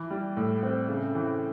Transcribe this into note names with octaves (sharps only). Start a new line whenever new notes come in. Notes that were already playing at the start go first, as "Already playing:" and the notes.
Already playing: E3
G3
A2
C4
C#3
E3